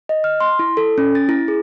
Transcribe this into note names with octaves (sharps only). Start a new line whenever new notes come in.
D#5
F6
C6
E4
A4
C#4
A6
E4
G#4